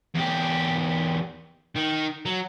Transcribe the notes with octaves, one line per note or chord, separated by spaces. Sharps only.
E2 G4
D#3
F#3